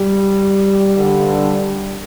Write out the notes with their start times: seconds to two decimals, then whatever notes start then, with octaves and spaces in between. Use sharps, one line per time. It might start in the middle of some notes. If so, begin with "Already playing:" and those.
Already playing: G3
0.94 G2 D3